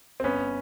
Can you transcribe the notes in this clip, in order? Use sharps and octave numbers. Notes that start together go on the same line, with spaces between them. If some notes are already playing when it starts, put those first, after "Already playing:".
C4
G1 B3 C#4